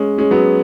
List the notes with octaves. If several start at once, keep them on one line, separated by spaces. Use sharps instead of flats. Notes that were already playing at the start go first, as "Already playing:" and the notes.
Already playing: G#3 C#4
G#3 C#4
F#3 B3